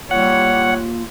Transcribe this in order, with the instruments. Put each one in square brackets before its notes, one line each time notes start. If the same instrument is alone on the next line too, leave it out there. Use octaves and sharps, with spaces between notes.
[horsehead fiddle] G3 C#5 [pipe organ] A#3 F4 [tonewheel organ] F#5